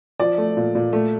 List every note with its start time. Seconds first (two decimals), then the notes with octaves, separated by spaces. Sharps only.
0.20 F3 D5
0.38 A3
0.57 A#2
0.75 A#2
0.93 A3